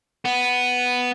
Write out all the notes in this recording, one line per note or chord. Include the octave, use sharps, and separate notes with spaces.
B3